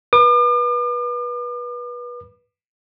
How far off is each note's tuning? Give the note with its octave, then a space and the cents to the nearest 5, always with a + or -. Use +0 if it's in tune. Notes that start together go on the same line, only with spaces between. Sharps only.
B4 -25 D6 +45